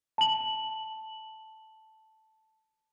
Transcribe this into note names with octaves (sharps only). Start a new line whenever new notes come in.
A5 F#7